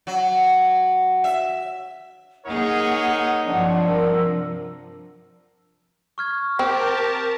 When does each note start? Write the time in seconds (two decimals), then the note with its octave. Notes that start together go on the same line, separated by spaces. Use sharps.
0.07 F#3
1.24 E5
2.45 A#3 D#4 G#4 A#4 C#5 F#5
3.47 G2 C3 F3 D4
3.87 A#4 E6
6.18 C#6 F6 G#6
6.59 C4 G4 A#4 A5